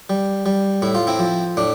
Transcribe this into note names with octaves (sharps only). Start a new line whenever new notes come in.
G3
G3
A2 E4
F4
C4 E4
F3
A2 D4